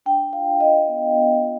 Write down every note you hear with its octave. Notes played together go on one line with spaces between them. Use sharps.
D4 G5
F4 F5
F4 D#5
B3
B3
F4